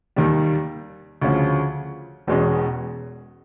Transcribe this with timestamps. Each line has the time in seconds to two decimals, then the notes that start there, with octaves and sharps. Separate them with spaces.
0.16 D#2 D#3 G3
1.21 D2 C#3 F3
2.27 E1 E2 B2 G#3 C#4